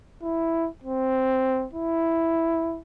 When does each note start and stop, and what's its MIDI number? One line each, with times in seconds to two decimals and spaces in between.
0.23 0.69 64
0.84 1.67 60
1.73 2.80 64